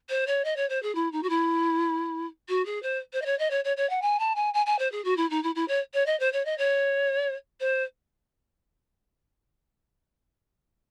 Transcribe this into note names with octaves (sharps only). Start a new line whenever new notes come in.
C5
C#5
D#5
C#5
C5
G#4
E4
D#4
F#4
E4
F#4
G#4
C5
C5
D#5
C#5
D#5
C#5
C#5
C#5
F#5
G#5
A5
G#5
G#5
G#5
C5
G#4
F#4
E4
D#4
E4
E4
C#5
C#5
D#5
C5
C#5
D#5
C#5
C5